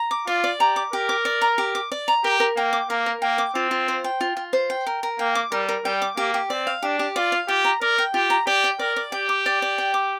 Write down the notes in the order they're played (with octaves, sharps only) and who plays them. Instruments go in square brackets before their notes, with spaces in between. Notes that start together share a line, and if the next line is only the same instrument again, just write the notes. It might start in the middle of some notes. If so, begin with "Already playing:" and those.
Already playing: [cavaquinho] A#5
D6
[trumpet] F4 [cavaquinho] D5
[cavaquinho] D5
[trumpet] G4 [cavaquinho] A#5
[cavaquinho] D6
[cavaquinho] G4 [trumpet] A#4
[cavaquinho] D6
D5
A#5
G4
D6
D5
A#5
[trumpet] G4 [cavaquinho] A#4
[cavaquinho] A#4
[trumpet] A#3 [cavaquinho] G5
[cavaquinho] D6
[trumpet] A#3 [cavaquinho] A#4
[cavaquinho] A#4
[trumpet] A#3 [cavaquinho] G5
[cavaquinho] D6
[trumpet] C4 [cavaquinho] F4
[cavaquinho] F4
C5
G5
F4
F4
C5
G5
A#4
A#4
[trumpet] A#3 [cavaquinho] G5
[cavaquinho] D6
[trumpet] G3 [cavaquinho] A#4
[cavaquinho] A#4
[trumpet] G3 [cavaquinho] G5
[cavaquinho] D6
[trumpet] A#3 [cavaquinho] G4
[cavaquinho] G4
[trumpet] C4 [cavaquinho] D5
[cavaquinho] F5
[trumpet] D4 [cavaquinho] G4
[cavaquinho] G4
[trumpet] F4 [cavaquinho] D5
[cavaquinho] F5
[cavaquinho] F4 [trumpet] G4
[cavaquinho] A#5
[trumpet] A#4 [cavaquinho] D5
[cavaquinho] G5
[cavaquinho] F4 [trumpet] G4
[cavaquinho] A#5
[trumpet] G4 [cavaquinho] D5
[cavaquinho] G5
[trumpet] A#4 [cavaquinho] D5
[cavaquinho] D5
[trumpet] G4 [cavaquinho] G5
[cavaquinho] D6
D5
D5
G5
D6